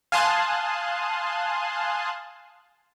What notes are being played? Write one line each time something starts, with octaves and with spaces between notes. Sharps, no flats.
F5 G#5 A5 C6 D#6 F#6